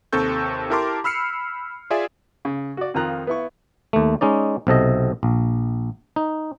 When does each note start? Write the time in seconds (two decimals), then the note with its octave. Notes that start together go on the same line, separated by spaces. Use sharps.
0.13 D#2 C3 C4 A4 C#6 G6
0.70 E4 G4 A#4 A5 C6 D6
1.04 B5 E6 F6 C7 C#7
1.90 F4 G#4 D5 E5 G#5
2.45 C#3
2.77 F#4 D5
2.94 F2 D#3 F4 A#5 F#6
3.27 B3 E4 C#6
3.93 D#2 A3
4.21 G#3 C#4 D#4 D5
4.67 B1 C3 A4 D#5
5.23 A#1
6.16 D#4